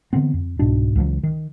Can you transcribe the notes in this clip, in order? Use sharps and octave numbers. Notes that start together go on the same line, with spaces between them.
D3 E3 B3 C4
F2
C2 G#2 B2 D4
C#2 E3 F#3
D#3